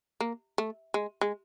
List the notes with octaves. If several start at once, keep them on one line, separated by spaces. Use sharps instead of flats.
A#3
A3
G#3
G#3